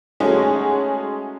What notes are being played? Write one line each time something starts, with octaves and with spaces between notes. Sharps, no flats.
G#3 A3 C#4 D#4 F#4 G#4